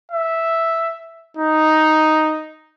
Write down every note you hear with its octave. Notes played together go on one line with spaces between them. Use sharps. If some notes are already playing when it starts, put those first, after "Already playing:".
E5
D#4